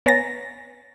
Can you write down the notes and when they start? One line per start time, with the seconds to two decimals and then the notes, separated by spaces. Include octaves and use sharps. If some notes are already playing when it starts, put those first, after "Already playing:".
0.06 B3 C#5 G#5 A#5 A6 A#6